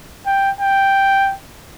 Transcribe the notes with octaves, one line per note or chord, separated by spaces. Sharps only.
G5
G5